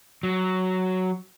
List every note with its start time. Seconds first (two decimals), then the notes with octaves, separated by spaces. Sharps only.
0.23 F#3